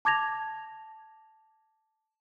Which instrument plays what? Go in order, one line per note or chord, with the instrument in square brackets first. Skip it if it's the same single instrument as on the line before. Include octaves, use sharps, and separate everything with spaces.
[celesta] A5 D6 G#6 A#6 F7